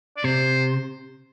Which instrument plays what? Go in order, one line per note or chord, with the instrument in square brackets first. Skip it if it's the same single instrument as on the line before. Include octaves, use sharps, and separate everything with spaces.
[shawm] D5
[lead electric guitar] C3 [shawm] C5